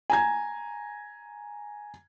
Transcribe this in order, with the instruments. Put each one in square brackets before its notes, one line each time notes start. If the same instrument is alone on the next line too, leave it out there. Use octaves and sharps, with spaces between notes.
[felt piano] G#5 A#5 G#6